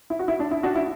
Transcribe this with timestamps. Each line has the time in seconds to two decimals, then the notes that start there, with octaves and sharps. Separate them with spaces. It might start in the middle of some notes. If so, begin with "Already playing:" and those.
0.10 E4
0.19 F#4
0.28 E4
0.40 D4
0.51 E4
0.63 D4 F#4
0.76 E4